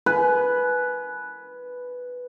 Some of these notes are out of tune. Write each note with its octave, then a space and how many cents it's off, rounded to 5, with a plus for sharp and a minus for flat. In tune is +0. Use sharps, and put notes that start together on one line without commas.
B4 +0 G#5 +30